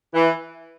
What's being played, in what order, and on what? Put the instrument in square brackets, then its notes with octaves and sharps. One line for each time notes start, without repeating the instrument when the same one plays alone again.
[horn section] E3